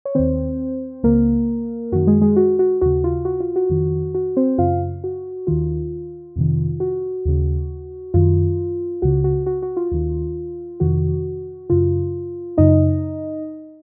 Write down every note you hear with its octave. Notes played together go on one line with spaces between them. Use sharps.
C#5
D#2 D#3 C4 C5
C#2 C#3 A#3 A#4
F#2 D#3 F#4
G#3 G#4
G#3 G#4
F#4
F#4
D#2 C#3 F#4
F4
F#4
F4
F#4
F2 D#3
F#4
C4 C5
F#2 C#3 F4 F5
F#4
D#2 D#3 F4
F2 C3 D#3
F#4
D#2 C#3
F#2 D#3 F4
C#2 C#3 F#4
F#4
F#4
F#4
F4
D#2 D#3
F2 C3 D#3 F#4
F#2 C#3 F4
F#2 C#3 D#4 D#5